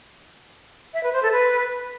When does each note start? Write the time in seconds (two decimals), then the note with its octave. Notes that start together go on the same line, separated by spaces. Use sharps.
0.94 E5
1.03 B4
1.13 C5
1.23 A4
1.32 B4